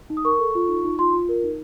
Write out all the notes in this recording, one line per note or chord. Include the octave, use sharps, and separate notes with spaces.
D#4
D#6
A#4 C#6
A4
F4
D#4
D#4
F4 C6
F4
A#4
D#4